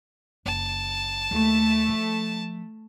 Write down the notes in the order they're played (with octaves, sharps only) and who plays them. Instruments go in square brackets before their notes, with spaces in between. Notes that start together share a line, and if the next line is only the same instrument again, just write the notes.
[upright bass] F#1 [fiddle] A5
[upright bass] D#2 [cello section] A3
[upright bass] F3